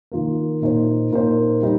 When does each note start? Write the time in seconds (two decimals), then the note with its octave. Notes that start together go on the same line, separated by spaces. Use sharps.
0.12 D#3 A#3 F4 A#4
0.62 A#2 A#3 D#4 C5
1.11 A#2 A#3 D#4 C5
1.62 G3 D#4